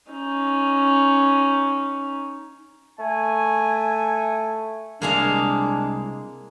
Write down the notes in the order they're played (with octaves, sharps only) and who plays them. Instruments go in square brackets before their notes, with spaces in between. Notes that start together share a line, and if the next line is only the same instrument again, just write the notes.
[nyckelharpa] C#4 D#4
[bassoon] A3 [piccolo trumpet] G#5
[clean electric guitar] C2 G#3 [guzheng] A#3 G#4 F5 [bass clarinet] D4